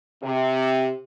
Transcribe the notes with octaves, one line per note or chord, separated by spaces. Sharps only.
C3